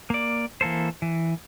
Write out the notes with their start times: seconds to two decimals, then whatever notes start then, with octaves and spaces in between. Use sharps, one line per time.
0.10 A#3 D5
0.61 E3 A#3 A4 C5
1.02 E3